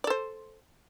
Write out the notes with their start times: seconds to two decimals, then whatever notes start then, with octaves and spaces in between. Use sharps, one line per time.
0.04 D5
0.07 A4
0.10 C5